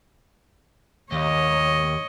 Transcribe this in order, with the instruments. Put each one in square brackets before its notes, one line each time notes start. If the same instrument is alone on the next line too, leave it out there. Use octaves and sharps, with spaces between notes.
[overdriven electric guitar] D#2 [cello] C#5 D#5